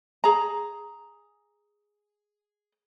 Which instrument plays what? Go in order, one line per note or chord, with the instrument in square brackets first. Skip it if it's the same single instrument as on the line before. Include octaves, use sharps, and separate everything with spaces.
[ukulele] G#4 A#5